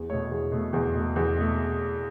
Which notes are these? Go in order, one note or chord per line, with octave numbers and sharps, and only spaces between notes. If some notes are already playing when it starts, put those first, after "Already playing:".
Already playing: E2
B2 A3 C#5
E2
B2 A3
E2
B2 A3
E2
B2 A3